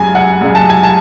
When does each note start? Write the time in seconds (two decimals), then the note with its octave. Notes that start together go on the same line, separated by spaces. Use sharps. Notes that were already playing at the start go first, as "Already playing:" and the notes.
Already playing: F#2 C#3 G#3 G#5
0.15 F#5
0.41 F#2 C#3 G#3
0.55 A5
0.70 G#5
0.83 A5